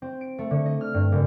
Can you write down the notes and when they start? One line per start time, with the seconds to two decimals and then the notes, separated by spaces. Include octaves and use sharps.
0.02 C4
0.21 D7
0.38 A3
0.51 D3
0.65 D#5
0.81 F6
0.94 G2
1.12 F#1